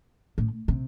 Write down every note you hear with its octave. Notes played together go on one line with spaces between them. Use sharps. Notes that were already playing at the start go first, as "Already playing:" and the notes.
A2
C3